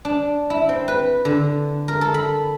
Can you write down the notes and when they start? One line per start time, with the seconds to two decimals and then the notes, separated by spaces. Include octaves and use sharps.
0.05 D4
0.50 E4
0.69 C4
0.88 B4
1.25 D3
1.88 A#4
2.01 A4
2.14 B5